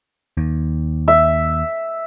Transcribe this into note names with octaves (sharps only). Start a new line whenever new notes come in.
D#2
E5